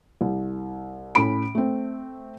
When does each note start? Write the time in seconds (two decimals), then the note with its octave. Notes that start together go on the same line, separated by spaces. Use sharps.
0.21 C2
1.15 A2 C#4 B5 D7
1.55 A3 C4